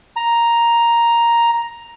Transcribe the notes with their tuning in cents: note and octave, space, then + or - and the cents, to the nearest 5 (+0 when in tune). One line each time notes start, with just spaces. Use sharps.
A#5 +5